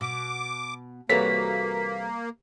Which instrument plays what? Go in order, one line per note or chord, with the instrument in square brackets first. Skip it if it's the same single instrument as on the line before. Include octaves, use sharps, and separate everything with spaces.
[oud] B2 [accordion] D6
[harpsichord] C2 E3 [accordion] A#3 [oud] F#4 A4 C#5 [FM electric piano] B6